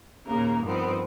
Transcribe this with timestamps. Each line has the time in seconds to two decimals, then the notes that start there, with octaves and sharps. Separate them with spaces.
0.24 D#2 A#2 C#3 A#3 A#4
0.61 G2 D#3 F3 B3 C4